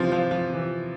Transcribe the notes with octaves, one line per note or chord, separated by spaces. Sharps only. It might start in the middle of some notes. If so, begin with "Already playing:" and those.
Already playing: C3 E3 F3 C4 F4
F3 F4
F3 F4
C3 E3